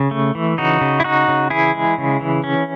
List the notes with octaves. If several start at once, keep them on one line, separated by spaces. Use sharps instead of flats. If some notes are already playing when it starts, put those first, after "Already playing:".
Already playing: C#3
A3
E3
C#3 D#4 F#4
C#3
E4
C#3 D#4 F#4
C#3
E3 E4 G#4
G#3
C#3
E3
C#4